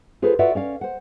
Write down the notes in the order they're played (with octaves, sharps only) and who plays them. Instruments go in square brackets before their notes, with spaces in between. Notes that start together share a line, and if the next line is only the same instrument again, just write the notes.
[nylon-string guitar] F4 G#4 A4 B4 C5
F4 F#4 B4 D5 E5 F#5
C#4 D5 F5
C5 F#5